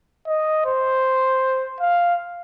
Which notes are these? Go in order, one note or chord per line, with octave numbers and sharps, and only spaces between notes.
D#5
C5
F5